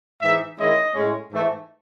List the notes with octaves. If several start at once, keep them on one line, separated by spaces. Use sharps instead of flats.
G#2 E3 G#3 D#4 E5
D#3 G#3 C#4 E4 D#5
A2 G#3 C#4
G#2 E3 A3